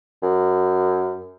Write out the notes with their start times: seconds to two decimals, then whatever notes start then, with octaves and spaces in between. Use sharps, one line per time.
0.23 F#2